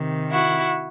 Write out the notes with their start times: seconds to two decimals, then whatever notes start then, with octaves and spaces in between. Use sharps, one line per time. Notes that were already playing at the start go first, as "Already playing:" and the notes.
Already playing: C3 D#3
0.31 E4 F#4